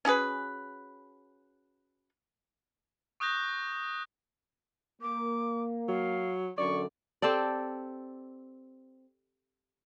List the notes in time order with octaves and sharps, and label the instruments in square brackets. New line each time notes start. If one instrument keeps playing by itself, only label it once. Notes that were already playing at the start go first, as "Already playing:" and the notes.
[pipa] C#4 F#4 G#4 B4
[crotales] C#6 D#6 F#6 G6 A#6
[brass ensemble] A#3 [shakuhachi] D6
[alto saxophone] F#3 [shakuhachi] F5
[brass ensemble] F#2 D3 [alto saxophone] D5 [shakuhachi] C#6
[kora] C4 G4 A4 D5